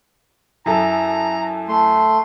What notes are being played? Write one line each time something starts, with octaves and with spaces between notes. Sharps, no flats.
F#2 E4 A4 E5 G#5 A#5
A3 C6